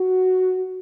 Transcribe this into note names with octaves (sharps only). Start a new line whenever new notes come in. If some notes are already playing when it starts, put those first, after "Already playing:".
Already playing: F#4